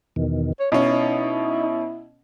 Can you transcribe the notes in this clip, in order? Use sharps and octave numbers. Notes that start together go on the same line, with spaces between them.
E2 B2 D#3
C#5
B2 C#4 D#4 E4